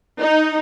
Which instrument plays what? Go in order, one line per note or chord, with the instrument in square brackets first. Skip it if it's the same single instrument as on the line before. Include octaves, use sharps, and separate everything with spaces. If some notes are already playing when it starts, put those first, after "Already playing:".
[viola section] D#4